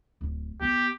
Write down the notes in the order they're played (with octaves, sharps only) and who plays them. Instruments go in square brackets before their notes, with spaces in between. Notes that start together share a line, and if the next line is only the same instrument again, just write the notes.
[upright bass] D1
[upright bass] B3 [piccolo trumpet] G4